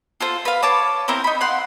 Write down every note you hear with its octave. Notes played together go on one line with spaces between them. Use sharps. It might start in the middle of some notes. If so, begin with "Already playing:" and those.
F4 A4 C5
B4 F5
C#5 A5 D6
C4 E4 A#4 C5
D#4 B5
F5 F#5 C6